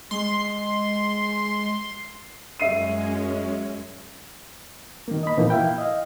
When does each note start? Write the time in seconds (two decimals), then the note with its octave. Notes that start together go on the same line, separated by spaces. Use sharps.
0.11 G#3 C6
2.60 F#2 G#3 C#4 E5 C7 D#7
5.08 D#3 A#3
5.23 D#5 B5
5.37 A#2 E3 F3 A#3 D#4
5.50 E4 E5 F5 G5
5.78 D#5 F5